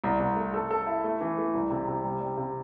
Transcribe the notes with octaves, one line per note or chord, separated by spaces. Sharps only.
C2
C2
A3
A4
A4
E4
A3
E3
A3
C2
C3
C3
G3
G3
C3